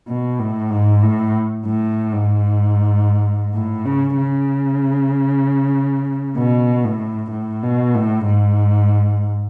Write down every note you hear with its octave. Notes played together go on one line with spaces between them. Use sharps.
B2
A2
G#2
A2
A2
G#2
A2
C#3
C#3
B2
A2
A2
B2
A2
G#2